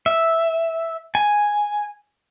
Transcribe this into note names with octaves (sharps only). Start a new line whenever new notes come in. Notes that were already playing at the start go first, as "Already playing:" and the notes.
E5
G#5